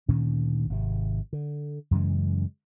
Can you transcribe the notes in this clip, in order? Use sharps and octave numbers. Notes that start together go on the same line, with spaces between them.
D2 A#2 D#3 C#4
G#1 C3
D3
F#2 C#3 E3 G#3